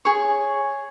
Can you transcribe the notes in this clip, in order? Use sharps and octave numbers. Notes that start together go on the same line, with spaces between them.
G#4 C#5